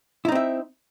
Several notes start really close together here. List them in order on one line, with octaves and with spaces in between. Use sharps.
E4 D#4 C4 E5